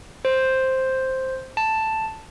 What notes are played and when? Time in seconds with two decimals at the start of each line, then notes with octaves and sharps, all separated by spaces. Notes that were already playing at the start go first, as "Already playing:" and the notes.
0.25 C5
1.57 A5